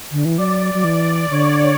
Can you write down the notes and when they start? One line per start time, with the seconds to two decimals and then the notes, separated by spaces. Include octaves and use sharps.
0.12 D3
0.25 E3
0.38 F#3 D5
0.74 F#3
0.84 E3
1.30 D3 C#5